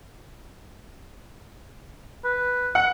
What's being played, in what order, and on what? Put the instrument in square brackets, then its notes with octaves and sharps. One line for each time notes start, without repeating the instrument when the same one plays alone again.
[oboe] B4
[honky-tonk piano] F#5